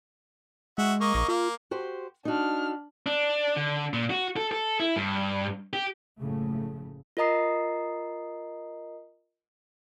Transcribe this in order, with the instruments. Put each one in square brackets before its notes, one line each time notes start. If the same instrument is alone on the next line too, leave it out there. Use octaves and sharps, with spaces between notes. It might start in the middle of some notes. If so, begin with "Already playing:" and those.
[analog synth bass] G#3 [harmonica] F#4 E5
[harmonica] A#3 D#5 C#6
[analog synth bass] A#1
[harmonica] A#3 [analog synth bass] F4
[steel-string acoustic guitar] F#4 G4 C5
[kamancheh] D4 F6 [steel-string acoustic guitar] D#4 F#4
[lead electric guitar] D4
D3
A#2
F#4
A4
A4
E4
G2
G4
[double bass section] F#1 A2 C#3 F3 A3
[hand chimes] F4 A#4 D#5 A#5 D#6 C7